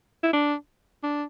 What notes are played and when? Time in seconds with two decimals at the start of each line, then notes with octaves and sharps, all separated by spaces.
0.23 E4
0.33 D4
1.03 D4